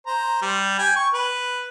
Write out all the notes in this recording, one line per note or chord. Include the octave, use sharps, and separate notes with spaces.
C5 A#5
G3
G5 G#5
C#6
B4